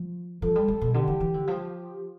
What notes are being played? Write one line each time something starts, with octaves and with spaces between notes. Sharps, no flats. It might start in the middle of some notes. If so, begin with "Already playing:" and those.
Already playing: F3
F3 A4
G3
G3
B2
D3 G4
E3
E3
D3
F3 G4